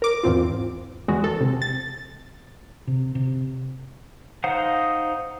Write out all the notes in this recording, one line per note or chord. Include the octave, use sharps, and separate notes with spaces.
A#4 D6
E2 G#2 C4 F4
E2 G#3 F#4
A4
C3
A6
C3
C3
D#4 C5 F5 F#5 D#6